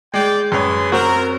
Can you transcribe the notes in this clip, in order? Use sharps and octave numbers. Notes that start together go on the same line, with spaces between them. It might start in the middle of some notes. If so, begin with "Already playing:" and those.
G#3 D5 G5
F#2 G#4 B4 C#5 C6
C4 F#4 A#4